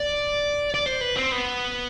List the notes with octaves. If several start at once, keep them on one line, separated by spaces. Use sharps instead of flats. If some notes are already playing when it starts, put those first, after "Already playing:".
Already playing: D5
D5
C5
B4
C4
B3